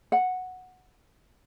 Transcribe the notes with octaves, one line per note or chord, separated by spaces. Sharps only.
F#5